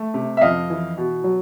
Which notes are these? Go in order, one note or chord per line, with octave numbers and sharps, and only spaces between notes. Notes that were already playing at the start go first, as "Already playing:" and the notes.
Already playing: A3
C3
E5
F2 D#5 F5
E3
B2
F#3